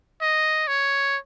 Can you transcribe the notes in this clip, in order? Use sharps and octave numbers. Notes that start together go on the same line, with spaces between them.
D#5
C#5